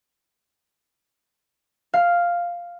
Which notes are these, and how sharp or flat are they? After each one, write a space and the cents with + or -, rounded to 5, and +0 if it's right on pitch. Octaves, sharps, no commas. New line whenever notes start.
F5 +0